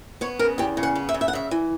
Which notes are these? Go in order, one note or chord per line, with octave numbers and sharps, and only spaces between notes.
B3 C#5
C#3 A#4
E2 G4
C#3
F#5
B3
E5
C#3
E5
F#5
C#3 E5
E3